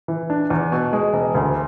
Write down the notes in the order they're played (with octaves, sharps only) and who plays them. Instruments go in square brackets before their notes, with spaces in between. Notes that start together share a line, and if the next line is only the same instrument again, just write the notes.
[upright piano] E3
D4
E2
B2
G#3
E1
D2